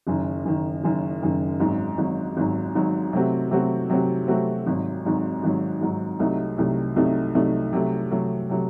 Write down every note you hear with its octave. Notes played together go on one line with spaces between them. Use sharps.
F#1 F#2 D#3
F#1 F#2 D#3
F#1 F#2 D#3
F#1 F#2 D#3
G#1 G#2 F#3
G#1 G#2 F#3
G#1 G#2 F#3
G#1 G#2 F#3
C3 F#3 A3 C4 F#4
C3 F#3 A3 C4 F#4
C3 F#3 A3 C4 F#4
C3 F#3 A3 C4 F#4
G#1 G#2 F#3
G#1 G#2 F#3
G#1 G#2 F#3
G#1 G#2 F#3
C2 C3 F#3 A3 D#4
C2 C3 F#3 A3 D#4
C2 C3 F#3 A3 D#4
C2 C3 F#3 A3 D#4
C3 F#3 A3
C3 F#3 A3
C3 F#3 A3